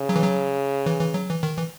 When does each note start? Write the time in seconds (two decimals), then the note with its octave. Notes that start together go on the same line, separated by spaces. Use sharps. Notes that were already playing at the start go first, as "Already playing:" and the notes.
Already playing: C#3
0.09 F#3
0.16 E3
0.24 F#3
0.86 E3
1.00 E3
1.14 F#3
1.29 E3
1.43 D#3
1.58 E3